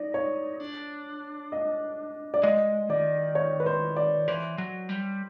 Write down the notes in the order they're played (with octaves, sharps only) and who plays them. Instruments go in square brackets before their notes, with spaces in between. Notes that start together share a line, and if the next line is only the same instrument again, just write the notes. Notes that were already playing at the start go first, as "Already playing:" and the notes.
Already playing: [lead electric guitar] D#4 [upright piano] D5
[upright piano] C#5
[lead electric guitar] D4
[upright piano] D#5
D5
[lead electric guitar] G#3 [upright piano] D#5
[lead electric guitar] D#3 [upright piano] D5
[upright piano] C#5
B4
C5
D5
[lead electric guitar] E3 [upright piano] C5
[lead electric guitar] F#3
G3